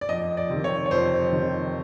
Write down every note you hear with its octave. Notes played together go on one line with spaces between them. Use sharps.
D5
F2 D#5
D5
C3
D#3
C#5
C#5
F2 C5
C3 D#3